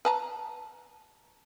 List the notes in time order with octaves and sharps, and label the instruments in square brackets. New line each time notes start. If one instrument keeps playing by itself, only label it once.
[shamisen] B4 A5 A#5